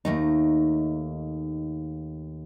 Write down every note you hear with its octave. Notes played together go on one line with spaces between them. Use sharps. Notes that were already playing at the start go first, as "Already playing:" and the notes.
D#2 A3 D#4